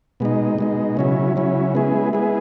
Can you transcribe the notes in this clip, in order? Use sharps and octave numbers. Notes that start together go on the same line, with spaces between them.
B2 G#3 D#4
B2 G#3 D#4
C#3 F#3 C#4 E4
C#3 F#3 C#4 E4
G#3 B3 E4 G#4
G#3 B3 E4 G#4